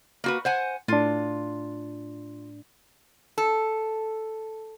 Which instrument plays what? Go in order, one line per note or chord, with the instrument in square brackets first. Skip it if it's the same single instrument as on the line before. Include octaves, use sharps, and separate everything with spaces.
[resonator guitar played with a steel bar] A#3 F#4 B4
C5 F#5 G#5
[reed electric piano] A2 D4 [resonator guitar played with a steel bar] F4
[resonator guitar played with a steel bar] A4